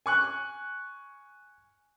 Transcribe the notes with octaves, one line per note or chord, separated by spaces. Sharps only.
G#5 C#6 F#6